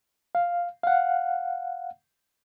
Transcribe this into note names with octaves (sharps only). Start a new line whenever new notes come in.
F5
F5 F#5